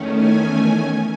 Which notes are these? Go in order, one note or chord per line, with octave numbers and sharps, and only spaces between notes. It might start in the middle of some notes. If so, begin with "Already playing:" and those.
Already playing: E2 D#3 A3 C#4
G#5